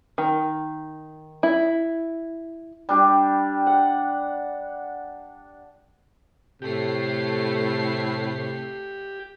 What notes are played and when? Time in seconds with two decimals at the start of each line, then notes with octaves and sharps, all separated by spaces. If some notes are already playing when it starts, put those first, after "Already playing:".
0.18 D#3
1.43 E4
2.89 G3 D4 G4
3.67 F#5
6.62 A2 C3 A3 G4 C7